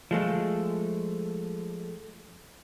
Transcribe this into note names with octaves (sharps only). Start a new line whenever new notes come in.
F3 G#3 A3